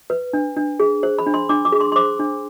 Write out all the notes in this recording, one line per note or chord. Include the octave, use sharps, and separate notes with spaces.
B4
D4
D4
G#4
C5
B5
D4
C6
D4 D6
D6
G#4
C6
C6
C5 D6
D4